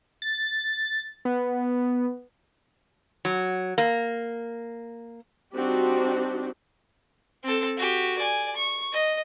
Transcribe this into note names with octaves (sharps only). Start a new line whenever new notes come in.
A6
B3
F#3
A#3
G3 C4 D4 D#4 F#4 G4
C4 A4
F#4 G4
D5 G#5
C#6
D#5